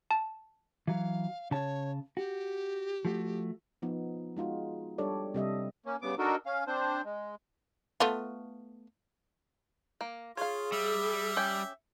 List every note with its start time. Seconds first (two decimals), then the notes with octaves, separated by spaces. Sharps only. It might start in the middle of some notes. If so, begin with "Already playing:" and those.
0.11 A5
0.88 E3 F#3 F5
1.51 C#3 C#5 A5
2.17 F#4 G4
3.05 F3 A3 F#4
3.82 F3 B3 D#4
4.37 G#3 D#4 F4 F#4
4.98 G3 D4 G4 A4 C#5 D5
5.34 C3 G3 D#5 E5
5.86 A#3 C#4
6.02 G2 C#3 B3 D6
6.19 D4 D#4 F#4 A4 A#4
6.46 C#4 F5
6.67 C4 D4 C5
7.05 G#3
8.00 A3 B3 F4
10.01 A#3
10.37 F4 G#4 C#5 F5
10.72 G3 E5
11.36 C#4 G4 G5